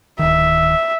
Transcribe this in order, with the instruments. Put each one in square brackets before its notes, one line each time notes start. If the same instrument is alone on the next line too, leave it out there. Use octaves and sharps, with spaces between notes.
[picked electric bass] D1 D#3 [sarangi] E5